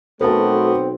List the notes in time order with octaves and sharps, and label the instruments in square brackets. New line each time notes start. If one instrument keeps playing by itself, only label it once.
[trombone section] B1 C4 [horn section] A3 B3 F#4 [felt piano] A#4 A5